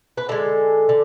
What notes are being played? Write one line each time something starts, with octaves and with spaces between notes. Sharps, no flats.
B4
D3 G#3 A4
D3